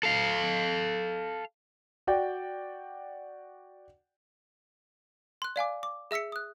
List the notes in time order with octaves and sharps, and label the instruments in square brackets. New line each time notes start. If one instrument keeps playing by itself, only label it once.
[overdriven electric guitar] A4 F5
[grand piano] F#4 D5 G5
[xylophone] C6 F#6
D5 F5 G#5 D6
D6
G#4 E5 E6 B6 C#7
D#6 F#6